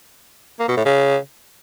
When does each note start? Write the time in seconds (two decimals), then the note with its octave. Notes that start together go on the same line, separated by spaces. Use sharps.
0.60 A#3
0.68 B2
0.77 A2
0.85 C#3